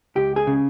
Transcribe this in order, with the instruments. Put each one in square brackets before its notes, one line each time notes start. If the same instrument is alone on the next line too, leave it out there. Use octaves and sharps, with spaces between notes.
[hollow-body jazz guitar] C#2 G4
G#4
C#3